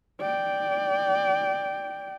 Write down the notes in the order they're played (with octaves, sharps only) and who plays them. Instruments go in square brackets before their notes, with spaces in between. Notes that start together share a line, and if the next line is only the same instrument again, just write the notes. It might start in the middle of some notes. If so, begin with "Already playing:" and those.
[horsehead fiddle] D5 G5